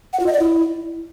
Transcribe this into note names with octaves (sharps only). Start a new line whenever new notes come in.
F#5
F4
D#5
D5
E4